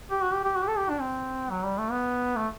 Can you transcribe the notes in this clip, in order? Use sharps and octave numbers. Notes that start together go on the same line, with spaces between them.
G4
F#4
G4
G4
F#4
G4
A4
G4
D4
C4
F#3
G3
A3
B3
A3